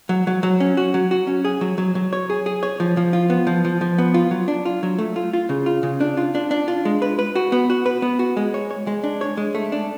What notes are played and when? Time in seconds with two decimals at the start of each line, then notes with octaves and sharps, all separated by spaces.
0.09 F#3
0.27 F#3
0.43 F#3
0.60 C#4
0.77 F#4
0.94 F#3
1.11 F#4
1.27 C#4
1.45 G#4
1.61 F#3
1.78 F#3
1.95 F#3
2.13 C#5
2.30 G#4
2.46 G#4
2.63 C#5
2.80 F3
2.97 F3
3.13 F4
3.30 B3
3.47 F3
3.65 F3
3.81 F3
3.98 B3
4.14 F4
4.31 F#3
4.48 D4
4.65 F4
4.83 F#3
4.98 A3
5.16 F4
5.33 F4
5.49 C#3
5.66 F4
5.83 C#3
6.01 D4
6.17 F4
6.35 D4
6.51 D4
6.68 F4
6.85 G#3
7.02 B4
7.19 B4
7.35 F#4
7.52 B3
7.70 F#4
7.86 B4
8.02 B3
8.19 F#4
8.37 G#3
8.54 C#5
8.71 C#5
8.87 G#3
9.04 D4
9.21 C#5
9.37 G#3
9.55 A3
9.72 D4